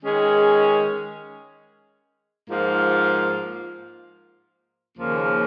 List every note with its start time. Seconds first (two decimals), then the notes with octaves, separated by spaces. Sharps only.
0.02 D#3 G#3 C#4 G#4
2.49 G#2 F3 A#3 F4
4.97 D#2 C#3 F3 A#3